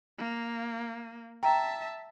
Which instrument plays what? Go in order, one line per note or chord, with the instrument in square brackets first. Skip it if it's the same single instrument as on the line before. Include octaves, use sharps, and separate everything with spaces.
[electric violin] A#3
[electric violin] E5 A5 [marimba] G5 A#5